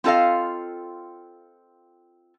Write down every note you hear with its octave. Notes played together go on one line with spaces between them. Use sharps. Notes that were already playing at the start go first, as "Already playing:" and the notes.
C4 F4 A4 D#5 F5